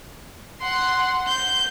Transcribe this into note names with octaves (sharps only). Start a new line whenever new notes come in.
F#5 C6
G6